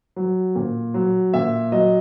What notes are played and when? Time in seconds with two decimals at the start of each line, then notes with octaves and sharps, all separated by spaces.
0.16 F#3
0.56 A#2
0.94 F#3
1.34 A#2 E5
1.72 F#3 D#5